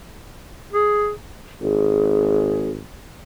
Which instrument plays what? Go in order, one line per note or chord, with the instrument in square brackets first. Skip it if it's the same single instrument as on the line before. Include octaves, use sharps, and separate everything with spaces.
[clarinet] G#4
[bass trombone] G#1 [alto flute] G#4